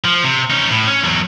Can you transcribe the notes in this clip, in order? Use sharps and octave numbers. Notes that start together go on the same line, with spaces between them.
F3
C3
C#4 D#4
A2
C#4
E2 F#3